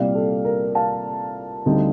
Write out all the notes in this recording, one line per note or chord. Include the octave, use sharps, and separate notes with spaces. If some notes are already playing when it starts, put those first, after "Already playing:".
Already playing: C2 A#2 G3 D5 F5
A4
A#4
F5 A5
D2 D3 G3 C4 D#4